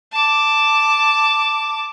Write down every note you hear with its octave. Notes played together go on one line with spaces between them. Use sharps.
A5 D6